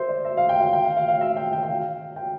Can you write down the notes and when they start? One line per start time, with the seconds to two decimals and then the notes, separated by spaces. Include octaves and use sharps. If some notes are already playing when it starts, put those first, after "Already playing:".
Already playing: C5 E5
0.09 D5
0.25 E5
0.37 F5
0.49 G5
0.61 F5
0.73 G5
0.84 F5
0.97 F5
1.08 F5
1.21 E5
1.37 G5
1.53 G5
1.63 G5
1.69 F5
2.16 G5